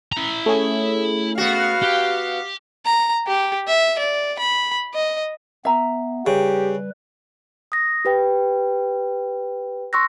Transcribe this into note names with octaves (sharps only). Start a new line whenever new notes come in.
E4 A#5
A3 C#4 G#4
B3 F#4 F5
G4
A#5
G4
E5
D5
B5
D#5
B3 E5 A#5
C#3 G3 G4 B4
D#6 A#6
G4 B4 G5
C6 C#6 E6 F#6 A#6